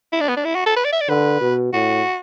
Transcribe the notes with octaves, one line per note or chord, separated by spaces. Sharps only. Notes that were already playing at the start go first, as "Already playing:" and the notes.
E4
D4
B3
D4
E4
F#4
A4
B4
D5
E5
D5
D3 B4
B2
A2 F#4